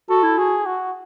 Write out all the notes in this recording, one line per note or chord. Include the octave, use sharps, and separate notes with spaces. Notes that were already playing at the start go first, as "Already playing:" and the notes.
F#4 A4
E4
F#4 G#4
F#4